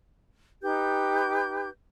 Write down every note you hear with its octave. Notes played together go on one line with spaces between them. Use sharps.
D#4 G4 B4 G6